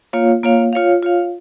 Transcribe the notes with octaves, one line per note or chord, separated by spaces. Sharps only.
A#3 F4 C#5 F5
A#3 F4 C#5 F5
F4 C#5 F5
F4 C#5 F5